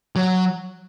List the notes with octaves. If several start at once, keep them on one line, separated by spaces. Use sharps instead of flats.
F#3